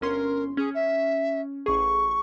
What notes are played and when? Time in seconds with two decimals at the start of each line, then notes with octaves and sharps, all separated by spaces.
0.01 G1 C#4 A#4 C6
0.57 C#4 G#4
0.74 E5
1.66 A1 G#4 C#6